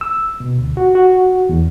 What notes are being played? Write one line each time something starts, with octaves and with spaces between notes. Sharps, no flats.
E6
B2
D2
F#4
F#4
E2